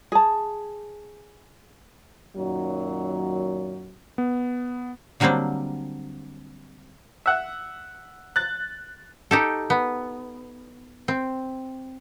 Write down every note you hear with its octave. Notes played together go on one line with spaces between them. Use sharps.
G#4 A5
F#2 A#2 D#3 F#3
B3
D3 F#3 G3 A#3 C4 D4
E5 F#5
F#6 A6
D#4 G4 A4
B3
C4